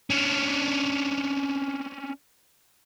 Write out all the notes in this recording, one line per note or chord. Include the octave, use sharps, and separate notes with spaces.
C#4 D4